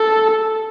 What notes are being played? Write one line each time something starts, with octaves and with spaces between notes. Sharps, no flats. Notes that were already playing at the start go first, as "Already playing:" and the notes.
Already playing: A4